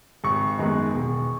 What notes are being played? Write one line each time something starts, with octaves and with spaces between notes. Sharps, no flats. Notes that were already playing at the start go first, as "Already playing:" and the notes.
G#1 C#6
F#2 D#3 G#3 B3
E1